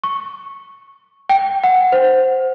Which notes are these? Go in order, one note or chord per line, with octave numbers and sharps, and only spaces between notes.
C#6
G5
F#5
C5